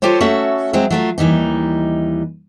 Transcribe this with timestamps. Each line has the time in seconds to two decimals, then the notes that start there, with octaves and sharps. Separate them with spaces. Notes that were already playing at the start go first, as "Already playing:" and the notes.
0.02 F4 G4 A4 C5 C#5
0.20 A3 C#4 F#4 A4 E5
0.73 F#3 G#3 C4
0.90 F#3 A3 F4
1.18 D#2 E3 G3 D#4